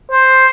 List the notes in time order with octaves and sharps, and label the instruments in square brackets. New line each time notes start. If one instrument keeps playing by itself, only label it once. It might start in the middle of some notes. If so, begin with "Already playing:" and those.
[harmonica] C5